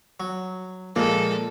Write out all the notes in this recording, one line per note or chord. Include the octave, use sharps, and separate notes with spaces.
F#3
A#2 F3 G#3 A#3 A4